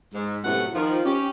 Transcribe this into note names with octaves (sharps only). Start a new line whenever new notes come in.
G#2
F#2 A2 C3 A3 B3 F#5
D#3 F3
C#4 G4